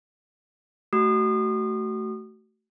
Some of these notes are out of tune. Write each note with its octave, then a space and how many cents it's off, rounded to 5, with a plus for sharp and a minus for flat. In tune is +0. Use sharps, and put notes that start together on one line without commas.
A3 +0 F#4 +30 D#6 -35